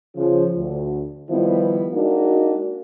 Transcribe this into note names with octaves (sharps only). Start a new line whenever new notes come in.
C#3 F3
D2
D#3 F3 G3 B3 E4
G#3 A#3 D4 D#4 F#4